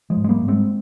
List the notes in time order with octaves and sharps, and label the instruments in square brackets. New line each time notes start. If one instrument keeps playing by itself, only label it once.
[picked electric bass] F3 G#3
G#2
G#3
G3 A#3
G#2
G#3 C4